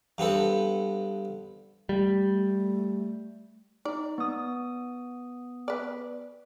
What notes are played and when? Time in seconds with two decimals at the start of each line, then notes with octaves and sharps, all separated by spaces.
0.18 G2 B3 C4 A4
1.89 G3 A3
3.85 D#4 D5
4.18 B3 D#6
5.68 B4 D5